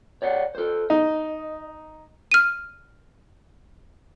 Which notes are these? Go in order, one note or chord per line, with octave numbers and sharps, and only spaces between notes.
C#5 D5 F#5
A4 C5
D#4 D#5
F6 D#7